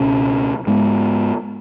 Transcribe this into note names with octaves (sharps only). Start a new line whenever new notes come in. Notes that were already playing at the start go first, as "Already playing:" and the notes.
Already playing: C#2 B2 C#4
G#2 G#3 B3